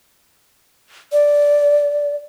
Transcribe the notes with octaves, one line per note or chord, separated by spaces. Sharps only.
D5